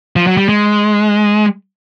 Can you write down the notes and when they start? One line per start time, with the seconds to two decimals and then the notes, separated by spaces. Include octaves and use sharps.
0.16 F3
0.27 F#3
0.37 G3
0.49 G#3